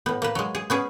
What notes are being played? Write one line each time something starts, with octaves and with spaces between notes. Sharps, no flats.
A2 B3
A#3 B4
F#3 G#3
G#4
B3 C#4 G#4